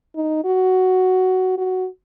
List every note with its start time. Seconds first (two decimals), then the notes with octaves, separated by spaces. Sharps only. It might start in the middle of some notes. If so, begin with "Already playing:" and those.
0.16 D#4
0.45 F#4
1.58 F#4